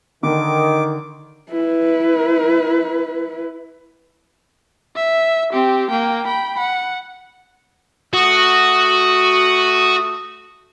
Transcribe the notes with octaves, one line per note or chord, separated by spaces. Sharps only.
D3 D#3 D6
E4 B4
E5
C4 G4
A#3 G5
G5 B5
F#5
A3 F#4 D#6